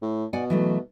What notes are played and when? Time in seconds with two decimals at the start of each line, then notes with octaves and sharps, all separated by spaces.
0.02 A2
0.33 B2 D5 F#5 G#5
0.50 E3 F#3 A3